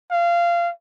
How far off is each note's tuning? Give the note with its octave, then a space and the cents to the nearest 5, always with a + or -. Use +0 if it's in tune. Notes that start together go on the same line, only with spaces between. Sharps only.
F5 -20